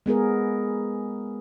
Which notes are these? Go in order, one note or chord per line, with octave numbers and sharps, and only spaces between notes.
G#3 B3 G#4 A#4